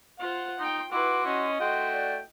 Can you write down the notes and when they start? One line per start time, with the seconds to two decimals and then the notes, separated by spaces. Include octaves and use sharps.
0.19 F4 C5 F#5
0.59 D#4 G5 C6
0.92 E4 F#4 B4 C6 D6
1.26 C#4 D#5
1.60 A3 F#4 G5 C6
1.92 D5